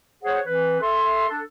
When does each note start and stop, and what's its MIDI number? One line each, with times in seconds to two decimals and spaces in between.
0.23 0.41 68
0.23 0.41 72
0.23 0.41 73
0.23 0.41 78
0.46 0.81 52
0.46 0.81 60
0.46 0.81 71
0.81 1.26 69
0.81 1.26 76
0.81 1.26 84
1.28 1.40 62
1.28 1.40 69